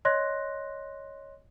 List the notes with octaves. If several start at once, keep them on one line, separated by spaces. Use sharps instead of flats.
C#5 D#5 C6 F#6 A#6